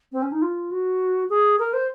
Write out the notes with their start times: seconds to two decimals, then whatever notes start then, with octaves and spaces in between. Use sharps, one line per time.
0.12 C4
0.22 C#4
0.32 D#4
0.42 F4
0.71 F#4
1.30 G#4
1.59 A#4
1.73 C5